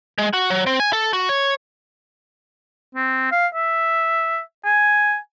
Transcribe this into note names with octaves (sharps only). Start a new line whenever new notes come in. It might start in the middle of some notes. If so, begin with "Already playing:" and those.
G#3
F#4
F#3
C4
G#5
A4
F#4
C#5
C4
F5
E5
G#5